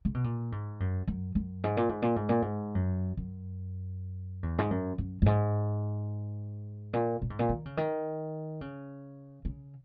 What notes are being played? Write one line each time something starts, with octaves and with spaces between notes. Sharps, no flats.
C#3
B2
A#2
G#2
F#2
F#2
F#2
G#2
A#2
G#2
A#2
G#2
A#2
G#2
F#2
F#2
E2
G#2
F#2
F#2
F#2
G#2
A#2
A#2
G#2
A#2
D#3
C#3
D#3
C#3
C#3